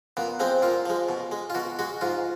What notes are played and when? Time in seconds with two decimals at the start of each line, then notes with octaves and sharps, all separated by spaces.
0.17 A#2 B3
0.40 F3 G#3 C4
0.62 A#2 F4
0.86 F3 G#3
1.09 B2
1.31 G#3
1.50 F4
1.55 B2 F#4
1.79 G#3 F#4
2.01 G#2 F4